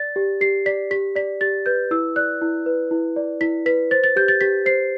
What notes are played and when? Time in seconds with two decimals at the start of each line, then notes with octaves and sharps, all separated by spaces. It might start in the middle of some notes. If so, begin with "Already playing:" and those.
Already playing: D5 A6
0.16 G4
0.41 G4 C7
0.66 D5 B6
0.91 G4 B6
1.16 D5 B6
1.41 G4 A6
1.66 B4 G6
1.91 E4 E6
2.16 D5 F#6
2.41 E4
2.66 B4
2.91 E4
3.16 D5
3.41 E4 B6
3.66 B4 B6
3.91 C5 A6
4.04 A6
4.16 G4 G6
4.28 A6
4.41 G4 B6
4.66 C5 C7